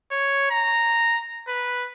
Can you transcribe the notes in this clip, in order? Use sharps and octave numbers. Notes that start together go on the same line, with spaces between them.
C#5
A#5
B4